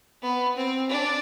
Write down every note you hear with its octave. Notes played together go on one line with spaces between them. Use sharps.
B3
C4
D4